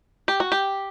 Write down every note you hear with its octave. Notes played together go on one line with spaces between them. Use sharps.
G4
F#4
G4